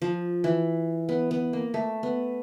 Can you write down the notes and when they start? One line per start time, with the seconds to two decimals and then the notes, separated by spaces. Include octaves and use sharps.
0.02 F3
0.44 E3
1.09 B3
1.31 B3
1.53 A#3
1.74 A3
2.03 B3